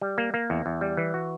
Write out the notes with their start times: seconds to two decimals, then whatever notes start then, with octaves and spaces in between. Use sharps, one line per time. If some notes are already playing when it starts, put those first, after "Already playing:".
0.01 G3
0.18 A#3
0.34 A#3
0.50 E2
0.66 E2
0.81 G3
0.97 E3
1.14 F#4